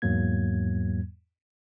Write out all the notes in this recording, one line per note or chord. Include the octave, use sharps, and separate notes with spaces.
E2 G#2 F#3 A#3 G#6